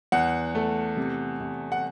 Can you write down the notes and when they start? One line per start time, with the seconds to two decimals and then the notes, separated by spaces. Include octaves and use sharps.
0.12 E2 F#5
0.55 A3
0.97 C3
1.40 C3
1.72 F#5